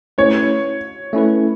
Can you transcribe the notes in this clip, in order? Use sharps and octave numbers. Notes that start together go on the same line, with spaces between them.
A3 C#4 E4 B4 C#5
A3 C#4 E4 B4